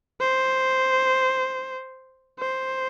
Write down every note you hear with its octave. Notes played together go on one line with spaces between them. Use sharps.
C5
C5